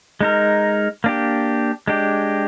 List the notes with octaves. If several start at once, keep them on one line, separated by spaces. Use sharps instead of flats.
G#3 D#4 A#4
A#3 D4 G4
G#3 D4 G4